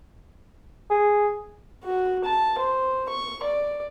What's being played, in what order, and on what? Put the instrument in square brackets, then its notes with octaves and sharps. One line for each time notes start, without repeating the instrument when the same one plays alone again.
[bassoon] G#4
[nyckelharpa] F#4
A5
C5
C#6
D5